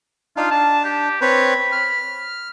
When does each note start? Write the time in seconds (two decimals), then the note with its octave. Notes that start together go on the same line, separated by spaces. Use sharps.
0.37 D4 D#4 F4 F5
0.51 D4 A5
0.84 G4
1.21 C4 B4 C#5 B5
1.72 F6